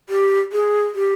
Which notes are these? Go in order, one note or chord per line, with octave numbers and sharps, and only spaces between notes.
G4
G#4
G4